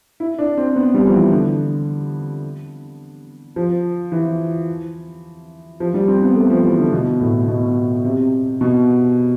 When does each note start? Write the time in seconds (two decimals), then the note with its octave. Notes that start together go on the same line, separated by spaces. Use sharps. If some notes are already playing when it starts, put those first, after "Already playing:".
0.20 E4
0.39 D4
0.57 C4
0.76 B3
0.94 G3
1.06 F3
1.13 E3
1.32 D3
3.56 F3
4.12 E3
5.80 F3
5.94 G3
6.08 C4
6.22 B3
6.36 A3
6.50 F3
6.64 E3
6.78 D3
6.92 B2
7.20 A2
7.48 B2
8.04 C3
8.61 B2